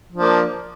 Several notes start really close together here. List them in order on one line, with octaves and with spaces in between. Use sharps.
F3 D4 A#3